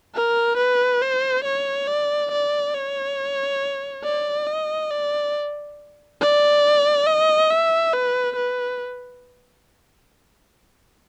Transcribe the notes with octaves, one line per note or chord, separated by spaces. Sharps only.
A#4
B4
C5
C#5
D5
D5
C#5
D5
D#5
D5
D5
D#5
E5
B4
B4